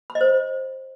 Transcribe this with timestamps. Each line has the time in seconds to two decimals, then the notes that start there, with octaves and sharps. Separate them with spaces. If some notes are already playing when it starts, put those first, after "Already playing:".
0.10 B5
0.15 D#5
0.21 C5